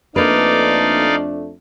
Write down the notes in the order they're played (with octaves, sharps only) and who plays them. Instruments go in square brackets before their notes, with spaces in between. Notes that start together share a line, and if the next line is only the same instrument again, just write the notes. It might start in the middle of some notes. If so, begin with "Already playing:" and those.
[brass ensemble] F2 A3 D4 [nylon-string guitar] A#3 B4 [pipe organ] D#4 D5 F5